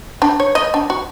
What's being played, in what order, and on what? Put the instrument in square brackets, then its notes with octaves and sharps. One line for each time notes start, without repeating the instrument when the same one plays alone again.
[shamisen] D4
C#5
D#5
D4
F#4